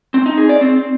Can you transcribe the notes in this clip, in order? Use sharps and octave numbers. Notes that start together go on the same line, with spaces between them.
C4
D#4
G#4
D5
C4